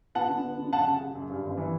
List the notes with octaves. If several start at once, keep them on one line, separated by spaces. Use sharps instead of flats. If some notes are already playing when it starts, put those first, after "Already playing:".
B3 F#5 A5
D3
B3
D3
F#2 F#5 A5
C#3
C#3
F#2
G2
G1
E3